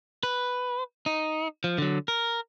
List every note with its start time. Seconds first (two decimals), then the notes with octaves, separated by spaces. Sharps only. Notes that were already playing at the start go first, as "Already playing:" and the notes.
0.23 B4
1.06 D#4
1.64 F3
1.78 D3 F#3
2.08 A#4